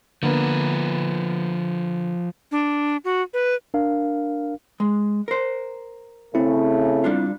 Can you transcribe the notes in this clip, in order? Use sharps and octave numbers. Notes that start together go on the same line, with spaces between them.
D3 F3 A#3 B3 B4
D4
F#4
B4
D4 A#4 F5
G#3
A#4 C5
C#3 A3 C4 E4
G3 D4 F4